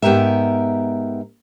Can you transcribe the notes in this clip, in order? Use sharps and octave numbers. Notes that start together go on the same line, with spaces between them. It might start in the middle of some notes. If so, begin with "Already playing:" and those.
G#2 B3 G4 A#4 E5